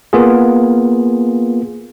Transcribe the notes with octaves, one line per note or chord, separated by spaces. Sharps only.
A#3 B3 F4 G#4